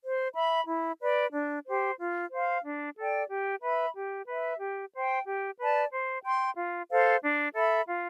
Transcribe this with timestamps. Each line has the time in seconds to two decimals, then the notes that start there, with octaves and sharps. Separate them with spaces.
0.02 C5
0.34 E5 B5
0.67 E4
1.00 B4 D5
1.33 D4
1.66 G4 C5
1.98 F4
2.31 C5 F5
2.63 D4
2.97 A4 D5 G5
3.30 G4
3.62 B4 E5 B5
3.95 G4
4.27 B4 E5
4.60 G4
4.93 C5 G5
5.25 G4
5.58 B4 D5 A5
5.92 C5
6.24 G5 C6
6.56 F4
6.90 A4 C5 F5
7.23 D4
7.55 A4 E5 B5
7.87 F4